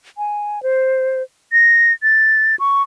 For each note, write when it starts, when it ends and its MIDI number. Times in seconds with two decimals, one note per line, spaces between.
0.18 0.62 80
0.63 1.22 72
1.53 1.93 94
2.03 2.56 93
2.59 2.82 85